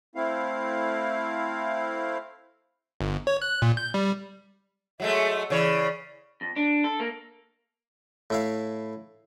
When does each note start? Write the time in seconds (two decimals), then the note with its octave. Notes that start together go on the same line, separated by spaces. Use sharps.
0.15 A3 C4 E4 F5
3.00 G1
3.27 C#5
3.42 F#6
3.62 A#2
3.77 G6
3.94 G3
5.00 F#3 G#3 A3 E5
5.50 C#3 E3 C#5 D5
6.41 F2
6.56 D4
6.84 A4
7.00 A#3
8.30 A2 E4 F5